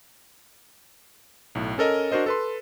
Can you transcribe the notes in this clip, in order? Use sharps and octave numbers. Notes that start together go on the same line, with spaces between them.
B1 A2
C#4 A4 A#4 D#5
D4 F#4 A#4 C5 D#5
A4 B4 C6